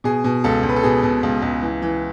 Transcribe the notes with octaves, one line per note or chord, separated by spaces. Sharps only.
B2 G#4
B2
C#2 A4
C#2
B4
A4
B2 G#4
B2
C#2
C#2
E3
E3